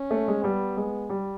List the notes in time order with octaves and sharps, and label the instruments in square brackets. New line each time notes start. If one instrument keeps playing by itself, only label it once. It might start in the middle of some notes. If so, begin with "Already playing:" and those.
Already playing: [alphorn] C#4
[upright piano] A3
G#3
[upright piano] G3 [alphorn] B3
[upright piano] G#3
G3